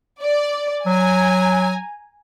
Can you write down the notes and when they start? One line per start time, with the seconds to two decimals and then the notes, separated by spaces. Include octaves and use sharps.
0.22 D5
0.86 F#3 G#5 A#5